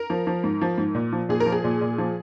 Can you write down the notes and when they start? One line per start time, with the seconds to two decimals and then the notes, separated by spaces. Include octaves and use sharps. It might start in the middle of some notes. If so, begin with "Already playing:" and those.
Already playing: A#4
0.10 F3
0.27 F3
0.44 G#2
0.62 F3
0.78 G#2
0.95 A#2
1.13 F3
1.29 A#2 G#4
1.40 A#4
1.46 F3
1.52 G#4
1.64 A#2
1.81 A#2
1.98 F3